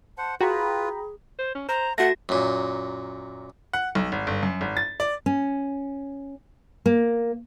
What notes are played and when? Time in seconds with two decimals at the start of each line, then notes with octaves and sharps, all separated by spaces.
0.18 C5 F#5 A5
0.41 F4 F#4 G#4 B4 G5 A#5 B5
1.39 C5
1.55 C#4
1.69 C5 A#5
1.98 A3 F#4 F#5 A#6
2.29 F#2 A#2
3.73 F#5
3.95 B1
4.12 G#1
4.27 G1
4.43 F#2
4.61 G#1
4.77 A6
5.00 D5
5.26 C#4
6.86 A#3